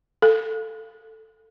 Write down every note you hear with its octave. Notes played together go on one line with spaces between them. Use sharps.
A4